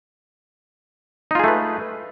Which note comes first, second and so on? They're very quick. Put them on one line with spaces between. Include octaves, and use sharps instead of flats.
D#4 F4 G#4 A3 B4